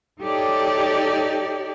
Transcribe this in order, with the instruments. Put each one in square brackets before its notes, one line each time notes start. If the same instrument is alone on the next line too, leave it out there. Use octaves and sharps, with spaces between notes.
[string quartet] D#4 G4 A4 C#5 D5